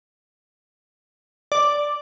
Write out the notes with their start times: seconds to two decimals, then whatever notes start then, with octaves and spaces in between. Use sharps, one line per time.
1.52 D5